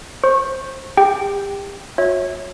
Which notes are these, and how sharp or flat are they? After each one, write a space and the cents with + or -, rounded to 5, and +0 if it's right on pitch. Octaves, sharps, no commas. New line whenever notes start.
C5 +20 C#6 -25
G4 +35 G5 +0
F#4 -40 C#5 -10 E5 -20